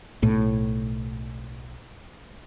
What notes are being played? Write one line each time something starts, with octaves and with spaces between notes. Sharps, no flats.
B1 A2